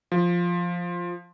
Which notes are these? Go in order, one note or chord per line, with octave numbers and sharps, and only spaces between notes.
F3